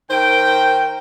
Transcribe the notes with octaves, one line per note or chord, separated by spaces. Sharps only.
D#3 A#4 C5 G5